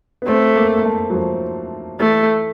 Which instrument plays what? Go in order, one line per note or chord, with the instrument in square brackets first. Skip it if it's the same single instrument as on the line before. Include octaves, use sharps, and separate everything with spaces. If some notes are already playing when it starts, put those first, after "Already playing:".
[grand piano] B3
[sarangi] A3 [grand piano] C4
[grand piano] A#3
A#3
A3
F#3
F3
[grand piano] E3 [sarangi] A3